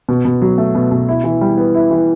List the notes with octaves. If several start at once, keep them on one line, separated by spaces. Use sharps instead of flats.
B2
B2
F#3
A3
B2
B2
E4
E3
G3
B3
E4
E3